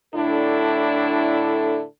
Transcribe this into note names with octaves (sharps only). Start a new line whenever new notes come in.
A2 D3 D4 E4 A4